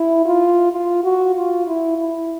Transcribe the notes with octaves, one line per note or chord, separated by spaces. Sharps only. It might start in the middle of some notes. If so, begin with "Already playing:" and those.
Already playing: E4
F4
F4
F#4
F4
E4
E4